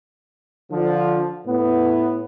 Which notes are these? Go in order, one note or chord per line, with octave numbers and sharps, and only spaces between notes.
D3 F3
A2 B3